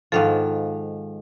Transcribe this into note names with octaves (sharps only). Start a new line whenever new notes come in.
G#2 D#3 F3 A4 F5